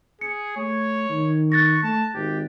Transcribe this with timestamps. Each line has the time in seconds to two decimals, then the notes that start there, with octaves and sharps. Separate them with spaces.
0.21 G#4 C#7
0.57 A3 C#5
1.09 D#3
1.52 C#6 F#6 A6 A#6
1.83 A3 A5
2.14 G#1 G4